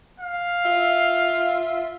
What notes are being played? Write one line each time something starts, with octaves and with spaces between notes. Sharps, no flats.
F5
F4 E5